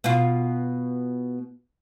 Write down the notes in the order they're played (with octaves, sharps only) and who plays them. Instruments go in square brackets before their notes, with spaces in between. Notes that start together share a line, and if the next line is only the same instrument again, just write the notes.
[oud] B2 F4